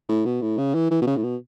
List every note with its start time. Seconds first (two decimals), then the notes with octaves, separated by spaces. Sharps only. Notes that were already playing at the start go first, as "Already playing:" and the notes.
0.09 A2
0.26 B2
0.42 A2
0.58 C#3
0.74 E3
0.91 E3
1.02 B2
1.07 C#3
1.17 A2
1.23 B2